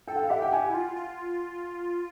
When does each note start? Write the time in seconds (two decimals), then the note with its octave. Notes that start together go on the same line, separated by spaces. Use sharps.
0.08 A4 G5
0.16 F#5
0.23 F5
0.30 G4 E5 F#5
0.42 G5
0.52 G4 F#5 G#5
0.70 E4
0.74 F4
0.97 F4